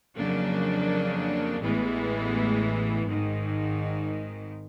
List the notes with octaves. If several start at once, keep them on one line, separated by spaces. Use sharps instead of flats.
F2 C#3 F#3 A#3 D4
A1 A2 E3 G#3 B3
G#1 G#2 D#3